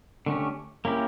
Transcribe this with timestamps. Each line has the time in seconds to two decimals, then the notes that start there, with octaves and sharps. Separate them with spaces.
0.26 D3 A3 C#4 G4
0.85 A#3 C#4 E4 G4